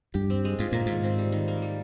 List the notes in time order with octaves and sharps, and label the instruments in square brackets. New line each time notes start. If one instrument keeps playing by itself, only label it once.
[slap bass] G2 [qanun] G4
[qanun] C4
G#3
[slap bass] G#2 [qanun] F4
[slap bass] A#2 [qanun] A#3
[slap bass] G#2 [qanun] D#3
[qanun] C4
G3
D#3
A#3
G3